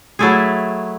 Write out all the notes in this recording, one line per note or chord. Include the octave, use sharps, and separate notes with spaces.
F#3 A3 E4 G#4